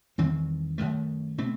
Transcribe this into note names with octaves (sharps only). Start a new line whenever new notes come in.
E2 D#3 G3 C4
F#2 D#3 A3
B2 A3 C4